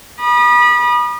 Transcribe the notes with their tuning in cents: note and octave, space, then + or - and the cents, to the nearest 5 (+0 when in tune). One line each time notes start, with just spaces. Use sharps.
B5 -30 D#6 -35